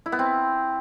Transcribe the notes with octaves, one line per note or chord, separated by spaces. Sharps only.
E4
B3
C4